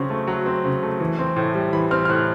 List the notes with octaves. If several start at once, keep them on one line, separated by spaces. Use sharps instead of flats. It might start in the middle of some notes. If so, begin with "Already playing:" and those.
Already playing: C#3 F#3 C4 C#6
A3
F#3
C4
C#3
A3
E3
C4
A2
G3
E3 B5
C4 F6
F6
A2 F#6